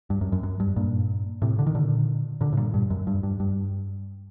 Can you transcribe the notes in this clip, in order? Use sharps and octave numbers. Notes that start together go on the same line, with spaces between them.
G2
F#2
F#2
F#2
G2
G2 A#2
A2 C3
D3
D#3
A#2 D3
A#2 D3
A2
G2 A#2
G2
F#2
G2
G2
G2